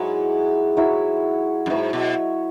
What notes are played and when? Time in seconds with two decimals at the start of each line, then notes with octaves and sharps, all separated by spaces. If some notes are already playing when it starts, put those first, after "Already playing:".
Already playing: G#2 F#3 E4 C#5 E5
0.77 F#3 E4 C#5 E5
1.66 F#2
1.70 G#2 F#3 E4 C#5 E5
1.93 B2